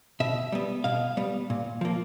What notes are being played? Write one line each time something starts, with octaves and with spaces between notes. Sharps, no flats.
B2 E5
G3 B3
B2 F5
G3 B3
A#2
F3 A#3